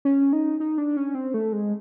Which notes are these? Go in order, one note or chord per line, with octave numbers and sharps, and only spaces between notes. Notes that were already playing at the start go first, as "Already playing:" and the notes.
C#4
D#4
D#4
D4
C#4
C4
A3
G#3